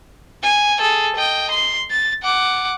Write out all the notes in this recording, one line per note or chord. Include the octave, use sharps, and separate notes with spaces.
G#5
G#4 A4
D#5 G5
C6
A6
F#5 D6